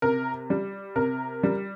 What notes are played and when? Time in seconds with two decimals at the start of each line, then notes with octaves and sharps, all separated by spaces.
0.02 C3 A#4
0.50 G3
0.96 C3 A#4
1.43 G3